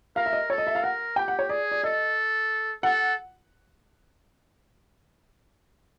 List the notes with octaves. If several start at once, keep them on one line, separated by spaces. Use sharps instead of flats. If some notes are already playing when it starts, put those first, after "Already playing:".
A#4 F5
E5
D#5
A4 C#5
D#5
E5
F5
A#4 F#5
G4 G5
F#5
C#5
G#4 D5
D5
A4 D#5
A4 F#5